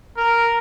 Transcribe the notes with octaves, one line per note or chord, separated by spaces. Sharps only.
A#4